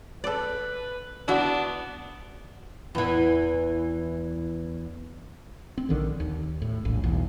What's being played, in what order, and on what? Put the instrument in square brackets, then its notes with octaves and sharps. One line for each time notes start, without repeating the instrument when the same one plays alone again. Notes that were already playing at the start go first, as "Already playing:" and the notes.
[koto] A4 D5 [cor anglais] B4
[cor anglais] B3 [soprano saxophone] D4 [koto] E4 F#4 E5
[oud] E2 E3
[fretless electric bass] C4
A#1 D3 D#3
D#2
A2
E1 A#1 A2
B1 E2